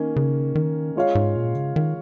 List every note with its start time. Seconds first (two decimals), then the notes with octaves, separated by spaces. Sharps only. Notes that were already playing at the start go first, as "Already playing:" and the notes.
Already playing: D#3 A#3 C#4
0.16 C#3
0.55 D#3
0.96 G#3 F4 C#5 F5
1.15 G#2
1.36 A#2
1.55 C#3
1.76 D#3